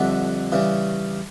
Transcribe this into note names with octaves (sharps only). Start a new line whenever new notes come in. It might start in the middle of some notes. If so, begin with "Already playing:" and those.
Already playing: F2 D3 G3 E5 F#5
C#3 E3 G3